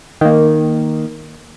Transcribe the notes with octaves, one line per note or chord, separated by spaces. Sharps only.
D#3 A#3